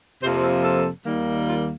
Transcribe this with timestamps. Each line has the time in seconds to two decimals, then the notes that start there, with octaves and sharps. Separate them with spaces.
0.22 F2 C3 F3 A#3 C5
0.44 A4
0.64 A4
1.06 D#2 D#3 G3 A#3
1.49 F4